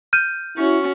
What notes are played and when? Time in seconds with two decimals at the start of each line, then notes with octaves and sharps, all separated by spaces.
0.13 F6 G6 D#7
0.58 C#4 E4 F#4